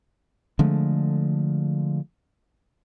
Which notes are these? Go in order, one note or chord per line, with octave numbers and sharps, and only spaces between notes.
D3 F3 G#3 A3